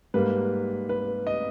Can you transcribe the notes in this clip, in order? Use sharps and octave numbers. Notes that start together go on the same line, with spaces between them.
G#2 G3 A#3 B4
B4
D#5